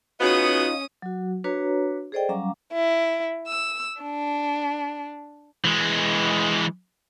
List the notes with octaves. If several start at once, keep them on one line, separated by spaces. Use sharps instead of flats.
C#3 B3 C#4 D#4 F4 F#4 D#6
F#3 F#4
D4 F#4 B4 C#5 A#5
G#4 A4 C5 D5 D#5 G5
F#3 G3 C#4 F5 A#5 D6
E4
E6
D4
E3 G#3